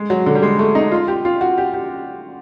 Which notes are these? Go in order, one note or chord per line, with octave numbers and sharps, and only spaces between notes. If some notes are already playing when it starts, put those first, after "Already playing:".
Already playing: G#3
F#3
D3
G3
G#3
A3
D#4
F4
G4
F4
F#4
G4
G4